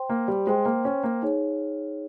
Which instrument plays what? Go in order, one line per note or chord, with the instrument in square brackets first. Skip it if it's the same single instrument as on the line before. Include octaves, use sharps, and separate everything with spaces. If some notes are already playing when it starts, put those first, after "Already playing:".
Already playing: [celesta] C5 G5 C6
[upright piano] A#3
G3
[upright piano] G#3 [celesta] C5 G5 C6
[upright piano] A#3
C#4
A#3
[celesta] D#4 G#4 C#5